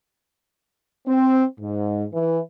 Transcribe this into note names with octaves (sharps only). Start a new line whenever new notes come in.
C4
G#2
E3